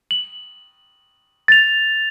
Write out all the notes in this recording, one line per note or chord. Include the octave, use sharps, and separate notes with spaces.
F#7
A6 F7